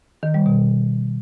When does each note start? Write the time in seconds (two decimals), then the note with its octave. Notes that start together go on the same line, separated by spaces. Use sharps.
0.23 D#3
0.34 G3
0.46 B2